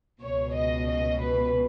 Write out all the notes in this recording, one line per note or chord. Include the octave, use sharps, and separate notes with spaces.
C#2 B2 C#5
D#5
D#5
B4